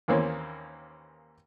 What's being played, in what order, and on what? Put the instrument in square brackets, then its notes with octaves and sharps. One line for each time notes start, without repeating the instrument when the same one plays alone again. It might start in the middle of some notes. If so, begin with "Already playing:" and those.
[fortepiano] D#2 D#3 E3 A#3 C4 C#4